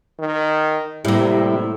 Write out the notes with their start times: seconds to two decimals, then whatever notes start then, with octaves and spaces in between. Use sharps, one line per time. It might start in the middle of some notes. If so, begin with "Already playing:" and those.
0.20 D#3
1.05 A2 C3 G3 A#3 E4